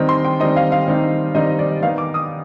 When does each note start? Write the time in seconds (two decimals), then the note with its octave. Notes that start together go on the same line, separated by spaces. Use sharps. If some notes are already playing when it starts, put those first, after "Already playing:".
Already playing: D#3 G3 C4 D#4
0.09 C6
0.25 G5
0.40 D#3 G3 C4 D#4 D#5
0.56 F5
0.72 F5
0.88 D#3 G3 C4 D#4
1.35 D#3 G3 C4 D#4 D#5
1.59 D5
1.82 D#3 B3 D#4 F5
1.98 D6
2.14 D#6